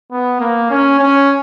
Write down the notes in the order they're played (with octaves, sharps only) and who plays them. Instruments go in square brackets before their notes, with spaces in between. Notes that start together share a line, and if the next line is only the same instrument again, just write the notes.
[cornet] B3
A#3
C#4
C#4